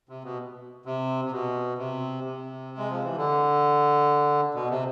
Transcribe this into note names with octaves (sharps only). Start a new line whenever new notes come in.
C3
B2
C3
C3
B2
C3
C3
G#3
F3
E3
D3
B2
C3